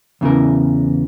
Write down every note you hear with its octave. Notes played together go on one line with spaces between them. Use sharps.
E2 C#3 E3 A#4